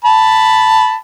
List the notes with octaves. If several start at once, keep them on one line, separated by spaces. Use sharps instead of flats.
A5 B5